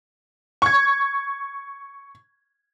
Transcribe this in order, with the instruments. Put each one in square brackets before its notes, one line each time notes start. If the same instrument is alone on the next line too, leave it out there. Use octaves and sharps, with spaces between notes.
[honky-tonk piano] C#6 G#6